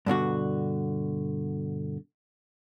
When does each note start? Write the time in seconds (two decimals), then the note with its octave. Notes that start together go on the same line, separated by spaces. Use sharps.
0.06 G2 B2 D3 F#4